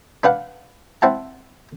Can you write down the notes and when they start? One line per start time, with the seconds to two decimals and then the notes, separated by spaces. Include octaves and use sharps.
0.24 D4 B4 F5 F#5
1.02 C4 E4 F#5 A5